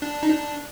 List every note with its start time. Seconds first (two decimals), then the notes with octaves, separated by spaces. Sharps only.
0.02 D4
0.23 D#4
0.30 D4